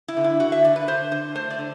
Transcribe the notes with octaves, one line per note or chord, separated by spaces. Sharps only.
E4
D3
E4
D3 F#4
E5
D3 D5
B4
D3 C5
D3 C5
A3 C5
D5
D3